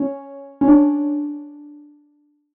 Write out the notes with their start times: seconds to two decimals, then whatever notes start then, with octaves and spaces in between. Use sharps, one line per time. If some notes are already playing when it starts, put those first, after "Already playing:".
Already playing: C#4
0.61 C#4
0.68 D4